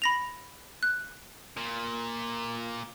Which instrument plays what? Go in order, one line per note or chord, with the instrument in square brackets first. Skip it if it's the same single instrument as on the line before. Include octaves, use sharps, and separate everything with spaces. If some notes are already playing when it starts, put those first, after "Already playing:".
[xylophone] B5 A#6 F7
F#6
[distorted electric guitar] A#2